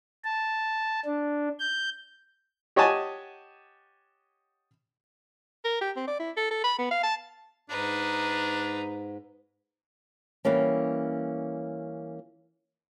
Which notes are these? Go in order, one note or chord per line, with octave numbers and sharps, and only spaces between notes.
A5
D4
G6
G4 C#5 D#5 F#5 G#5 A5
A#4
G4
C4
D5
E4
A4
A4
B5
B3
F5
A5
G#2 D4 D#4 B4
E3 G3 A#3 C#4